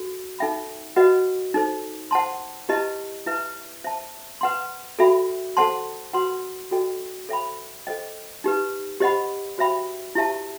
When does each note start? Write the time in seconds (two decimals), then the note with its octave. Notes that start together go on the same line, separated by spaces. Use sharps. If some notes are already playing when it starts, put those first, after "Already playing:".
Already playing: F#4 A4
0.39 D#4 A4 E5 G5 B5
0.96 F#4 B4 D#5 F#5
1.54 D#4 A4 C5
2.11 C5 F#5 A5 C6
2.69 E4 G4 B4 D#5 A5
3.26 E4 B4 E5 A5
3.84 C5 E5 A5
4.41 B4 F#5 C6
4.99 F#4 A4 E5 G5 B5
5.57 A4 C5 F#5 A5 C6
6.13 F#4 B4 F#5 C6
6.71 F#4 A4 D#5 G5
7.29 A4 C5 E5 G5 B5
7.87 A4 C5 D#5 G5
8.44 D#4 G4 B4
9.00 G4 C5 D#5 F#5 B5
9.58 F#4 C5 E5 G5 B5
10.15 E4 G4 C5 E5 A5